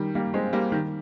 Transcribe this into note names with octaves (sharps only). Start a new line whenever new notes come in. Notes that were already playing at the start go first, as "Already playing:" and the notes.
Already playing: D#3 G3
G3 A#3
G#3 C4
G3 A#3
D#3 G3